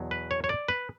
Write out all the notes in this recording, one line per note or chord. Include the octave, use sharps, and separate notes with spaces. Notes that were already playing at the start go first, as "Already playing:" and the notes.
Already playing: E2 B2 F#3
B4
C#5
C#5
D5
B4